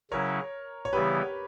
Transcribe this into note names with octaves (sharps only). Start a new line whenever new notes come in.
C#3 F#3 C#4 E4 A#4 C#5
C#5
C#3 E3 G3 B3 E4 G4 B4